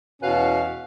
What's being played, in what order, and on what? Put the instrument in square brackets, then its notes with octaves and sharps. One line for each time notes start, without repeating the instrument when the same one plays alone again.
[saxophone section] E2 B2 C#4 F#4 B4 F5